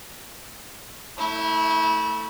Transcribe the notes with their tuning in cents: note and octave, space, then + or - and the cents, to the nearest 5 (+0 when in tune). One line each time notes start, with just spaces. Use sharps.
A3 +10 E4 -30